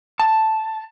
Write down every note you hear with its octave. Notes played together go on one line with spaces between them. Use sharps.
A5